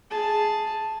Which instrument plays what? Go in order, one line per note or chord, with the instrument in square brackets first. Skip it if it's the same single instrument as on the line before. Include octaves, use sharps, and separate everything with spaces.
[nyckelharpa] G#4 A5